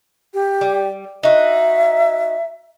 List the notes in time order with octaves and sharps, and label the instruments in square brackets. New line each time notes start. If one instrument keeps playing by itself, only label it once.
[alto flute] G4
[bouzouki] G3
[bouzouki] D#4 F#4 [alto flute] E5